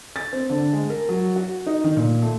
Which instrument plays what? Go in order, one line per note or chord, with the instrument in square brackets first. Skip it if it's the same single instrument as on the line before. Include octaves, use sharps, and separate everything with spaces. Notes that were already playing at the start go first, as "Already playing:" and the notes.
[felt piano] A6
C4
D3
G#3
A#4
F#3
F#4
D#4
D#3
A#2
A3